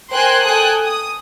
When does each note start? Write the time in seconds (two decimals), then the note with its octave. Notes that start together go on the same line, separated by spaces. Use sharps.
0.12 A#4 C5 G5 G#5 C6 F#6
0.44 A4 G5 G#5 D#6 F#6
0.86 D#6